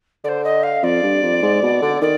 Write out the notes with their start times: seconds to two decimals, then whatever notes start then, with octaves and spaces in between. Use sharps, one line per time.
0.24 D3 C5 D5
0.44 D#5
0.63 F5
0.83 F2 D5
1.03 G2
1.23 F2
1.42 G#2
1.62 B2
1.82 D3
2.01 D#3 D5